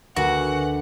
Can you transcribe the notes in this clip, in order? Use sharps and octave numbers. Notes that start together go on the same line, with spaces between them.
D2 F#4 A#4 B4 F#5 G#5